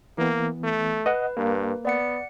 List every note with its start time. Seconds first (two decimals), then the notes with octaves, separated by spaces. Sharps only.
0.18 E3 A#3 B3
0.64 A3
1.06 B4 D#5 F#5
1.37 G2 A#3
1.85 B3 D5 F#5 C#7